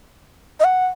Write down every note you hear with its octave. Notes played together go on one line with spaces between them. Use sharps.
D#5
F#5